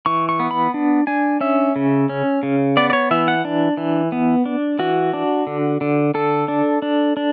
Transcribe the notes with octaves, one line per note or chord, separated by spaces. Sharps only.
E3 C#6
C#6
B3
B5
D4
D4 G#5
C#4 E5
C#3
C#4
C#3
B3 D5
D5
C#5
E3 E5
F#5
D4
E3
B3
D4
E3 F#4
D4
D3
D3
D3 A4
D4
D4
D4